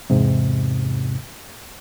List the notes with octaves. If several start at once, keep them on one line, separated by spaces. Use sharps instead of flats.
E2 G#2 C3